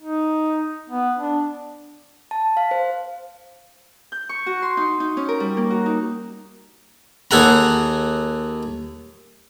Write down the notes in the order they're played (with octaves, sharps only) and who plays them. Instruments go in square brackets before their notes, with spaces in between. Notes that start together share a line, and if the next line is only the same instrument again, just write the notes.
[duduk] D#4
B3
D4
[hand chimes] A5
F5
C5
[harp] G6
C#6
F#4
C6
D#4
D#4
C#4
A#4
G3
A#3
F#4
D#4
[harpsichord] D#2 G#4 A4 F#5 A#5